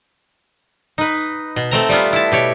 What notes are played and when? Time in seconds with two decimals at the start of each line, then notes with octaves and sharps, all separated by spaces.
0.98 D#4 B4
1.56 B2
1.71 A3 C4 A#5
1.89 G3 B3 F4
2.13 E4 A5
2.32 B2 G4 C#5